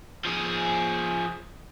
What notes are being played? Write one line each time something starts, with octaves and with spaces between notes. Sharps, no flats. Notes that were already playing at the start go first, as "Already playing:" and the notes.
F3 G#4